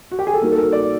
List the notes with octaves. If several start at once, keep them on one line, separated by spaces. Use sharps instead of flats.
F#4
G4
G#4
A4
G3 A#3 D#4 F#4 A#4
A4
A#4
D5